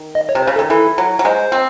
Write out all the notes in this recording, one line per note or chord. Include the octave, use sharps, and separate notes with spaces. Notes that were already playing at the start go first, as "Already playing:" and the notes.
Already playing: D#3
D#5
C#5
C3
C5
C#3
A4
D#3
E3 A4
F#3
F#3
G#3 C5
C4